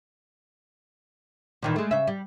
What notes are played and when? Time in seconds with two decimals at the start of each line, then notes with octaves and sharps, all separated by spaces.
1.62 A#2 D#3 E3
1.76 G#3 A3
1.91 C#3 E5
2.07 G3